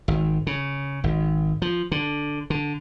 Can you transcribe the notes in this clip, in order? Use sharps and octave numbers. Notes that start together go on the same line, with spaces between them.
G#1
C#3
G#1
F3
D3
D3